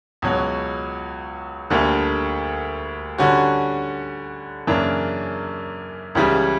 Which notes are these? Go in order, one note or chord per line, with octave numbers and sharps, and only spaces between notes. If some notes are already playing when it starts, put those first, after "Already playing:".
C#2 B2 F#3
D2 D3 G3 A#3
D3 G3 C#4 F#4
F#2 C#3 E3 A#3 D4
C#2 C#3 E3 G3